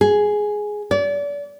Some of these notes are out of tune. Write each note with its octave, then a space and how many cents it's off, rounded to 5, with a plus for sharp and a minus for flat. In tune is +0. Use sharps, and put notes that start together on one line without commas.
G#4 +5
D5 -35